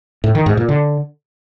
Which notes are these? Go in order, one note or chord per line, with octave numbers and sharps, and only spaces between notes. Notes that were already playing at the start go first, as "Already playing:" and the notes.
A2
D#3
G#2
A#2
D3